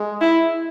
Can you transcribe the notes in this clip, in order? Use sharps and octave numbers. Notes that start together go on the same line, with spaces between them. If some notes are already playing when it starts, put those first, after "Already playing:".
Already playing: G#3
E4